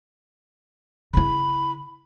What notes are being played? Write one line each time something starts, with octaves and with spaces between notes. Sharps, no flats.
C#3 E4 B5